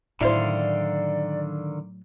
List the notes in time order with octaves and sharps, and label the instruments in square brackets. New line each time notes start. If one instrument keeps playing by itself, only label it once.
[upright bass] A2 F#3 [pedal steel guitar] D3 D#3 F5 [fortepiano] E4 C5 [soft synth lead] D5